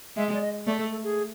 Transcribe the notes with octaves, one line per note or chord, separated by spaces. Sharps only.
G#3 E5
D5
D#5
A3 D5
A4
A4
G#4